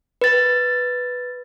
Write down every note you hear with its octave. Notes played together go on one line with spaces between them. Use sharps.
B4 A6